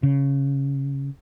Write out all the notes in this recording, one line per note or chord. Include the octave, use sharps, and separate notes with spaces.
C#3